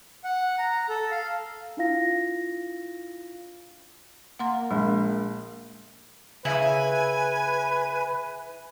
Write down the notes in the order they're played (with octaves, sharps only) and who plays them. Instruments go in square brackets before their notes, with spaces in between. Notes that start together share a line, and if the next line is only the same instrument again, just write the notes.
[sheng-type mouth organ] F#5
A#5
A4
F5
[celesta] D4 E4 F4 F5 A#6
[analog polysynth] A#3 [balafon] F#5 C6
[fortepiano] A#1 [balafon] G#3
[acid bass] C#3 [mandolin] E4 [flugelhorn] B4 [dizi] G#5